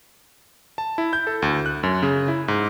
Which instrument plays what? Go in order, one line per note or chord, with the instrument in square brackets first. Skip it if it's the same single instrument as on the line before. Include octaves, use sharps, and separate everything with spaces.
[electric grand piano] A5
E4
G6
A4
D2
F#6
F#2
C#3
E4
G#2